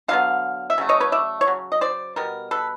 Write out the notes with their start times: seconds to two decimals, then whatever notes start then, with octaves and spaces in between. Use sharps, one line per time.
0.08 D3 F#3 B3 F5
0.70 E5
0.78 C#3 F#3 A3
0.89 C#5 D#5
1.00 B4 C#5
1.12 D5 E5
1.41 C#5
1.47 C#3 F#3
1.72 D#5
1.81 C5 D5
2.16 B2 G3 B3 A#4
2.51 A4 B4